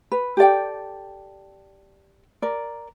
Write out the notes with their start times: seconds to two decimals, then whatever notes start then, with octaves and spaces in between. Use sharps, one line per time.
0.11 B4
0.37 G4 A4 D5 G5
2.42 A#4 D5